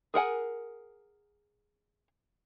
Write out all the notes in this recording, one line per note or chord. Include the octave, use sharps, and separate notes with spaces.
G#4 A#4 F#5 G#5